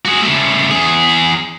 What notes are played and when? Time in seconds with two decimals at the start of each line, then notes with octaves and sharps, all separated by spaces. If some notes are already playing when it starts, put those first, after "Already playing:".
0.05 F#4 G#4
0.23 C#3 A3
0.71 E2 G#4